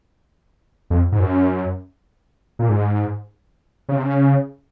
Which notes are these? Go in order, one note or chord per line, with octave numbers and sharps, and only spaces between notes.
F2
G#2
F#2
A#2
G#2
C#3
C3
C#3